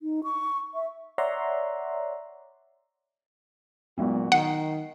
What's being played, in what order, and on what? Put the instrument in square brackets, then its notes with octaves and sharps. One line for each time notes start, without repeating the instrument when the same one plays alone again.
[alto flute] D#4
C#6
E5
[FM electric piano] C#5 D5 E5 F#5 A#5 C6
[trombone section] E2 A#2 F#4 [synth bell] F#3 G#3 B3
[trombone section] D#3 [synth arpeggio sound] F#5 [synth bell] C7